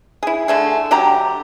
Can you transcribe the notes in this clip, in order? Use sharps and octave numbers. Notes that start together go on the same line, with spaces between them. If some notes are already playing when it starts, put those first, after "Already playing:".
E4 G#4
D3 A3 G#4
D3 F#3 G4 A#5